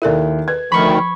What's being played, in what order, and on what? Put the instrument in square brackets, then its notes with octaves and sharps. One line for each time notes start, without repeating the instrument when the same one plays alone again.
[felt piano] D#2 E4 [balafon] A4 A#4 D5
[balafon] B4 [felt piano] G#6
[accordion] D2 D#3 [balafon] F3 [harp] B5 C#6